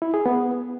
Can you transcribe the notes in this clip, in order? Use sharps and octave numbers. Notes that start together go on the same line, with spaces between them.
E4
G#4
B3